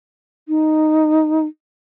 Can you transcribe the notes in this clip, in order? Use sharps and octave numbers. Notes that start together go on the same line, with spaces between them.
D#4